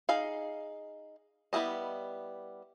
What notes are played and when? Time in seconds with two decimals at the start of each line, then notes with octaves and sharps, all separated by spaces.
0.09 D#4 G#4 F5
1.53 G3 B3 E4 G#4 D#5